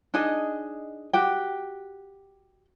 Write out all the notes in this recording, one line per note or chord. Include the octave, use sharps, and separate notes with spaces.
D4 D#4 G#4 D#5
F#4 G4 G5